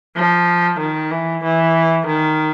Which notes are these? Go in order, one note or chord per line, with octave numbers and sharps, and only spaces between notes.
F3
D#3
E3
E3
D#3